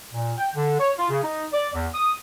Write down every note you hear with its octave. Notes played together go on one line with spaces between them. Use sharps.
A#2
G5
D3
C#5
F4
C#3
D#4
D5
E2
D#6